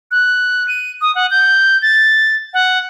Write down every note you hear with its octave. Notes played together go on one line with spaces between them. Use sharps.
F#6
D#7
D#6
F#5
G6
A6
F#5